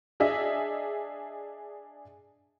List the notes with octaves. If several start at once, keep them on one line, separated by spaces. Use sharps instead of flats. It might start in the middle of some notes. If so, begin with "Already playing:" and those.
D4 G#4 D#5 E5